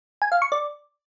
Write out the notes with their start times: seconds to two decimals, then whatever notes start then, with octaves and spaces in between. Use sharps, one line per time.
0.22 G#5
0.32 F5
0.42 C#6
0.52 D5